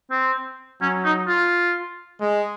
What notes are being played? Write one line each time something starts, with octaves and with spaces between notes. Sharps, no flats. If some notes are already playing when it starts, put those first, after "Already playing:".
C4
F#3 C#4
D#4
F4
G#3